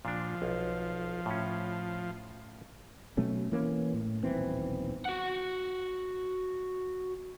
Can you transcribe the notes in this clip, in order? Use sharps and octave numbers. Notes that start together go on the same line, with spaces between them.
A#2 F3 D4
B1
A2 C#4
B2 F#3 A3 C#4
E3 A#3 C#4
A2
D#1 B1 E3 C4
F#4 F#5